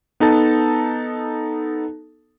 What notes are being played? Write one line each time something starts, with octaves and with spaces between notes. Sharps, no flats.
B3 D#4 A4 A5